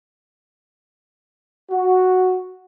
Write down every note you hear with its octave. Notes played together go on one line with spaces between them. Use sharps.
F#4